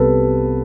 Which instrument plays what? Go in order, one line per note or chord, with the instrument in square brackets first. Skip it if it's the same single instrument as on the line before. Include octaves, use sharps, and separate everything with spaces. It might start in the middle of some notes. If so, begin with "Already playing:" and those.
Already playing: [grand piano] C2 C3 G3 B3 A4 B4